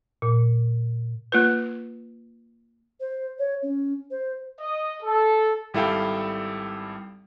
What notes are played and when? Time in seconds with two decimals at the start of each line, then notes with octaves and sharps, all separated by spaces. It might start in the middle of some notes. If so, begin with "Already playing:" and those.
0.22 A#2
1.32 A#3 F4 B4
3.00 C5
3.39 C#5
3.63 C#4
4.11 C5
4.60 D#5
5.02 A4
5.74 G#1 G3 E4 A4 F5 G5